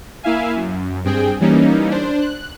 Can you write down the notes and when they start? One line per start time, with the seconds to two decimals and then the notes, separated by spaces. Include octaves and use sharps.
0.23 A#3 E4 E5 F5 G#5
0.56 F#2
1.04 G2 C4 G#4 G5
1.40 E3 G3 A#3 C#4 D#4
1.91 D4 C5
2.21 F#6